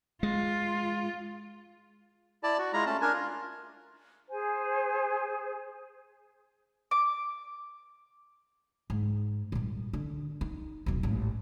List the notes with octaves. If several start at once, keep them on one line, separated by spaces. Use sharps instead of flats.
G#3 F4
E4 D5 A5
F#4
G#3 E4 F4 A#5
A3 C#4 A5
D4 A#4 G#5
F4
G#4 C5 G#5
D6
G#2
A#2 G3
D3
D#4
D#1 B1
A1 G#2